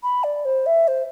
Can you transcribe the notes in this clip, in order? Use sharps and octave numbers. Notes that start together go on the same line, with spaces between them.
B5
D5
C5
E5
C5